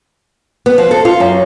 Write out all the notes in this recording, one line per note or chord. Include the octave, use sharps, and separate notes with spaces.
B3
F3
A4
F4
F#2